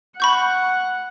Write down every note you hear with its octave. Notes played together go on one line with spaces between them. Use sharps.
F#5 B5 C#6 G6